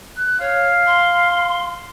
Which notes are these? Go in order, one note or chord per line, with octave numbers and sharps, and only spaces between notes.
F#6
C#5 F5
C6